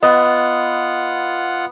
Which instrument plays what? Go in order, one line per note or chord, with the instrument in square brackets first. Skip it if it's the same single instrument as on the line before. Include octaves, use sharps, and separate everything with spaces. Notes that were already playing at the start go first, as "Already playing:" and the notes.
[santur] B3 [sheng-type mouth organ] F4 F#5 [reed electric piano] D#5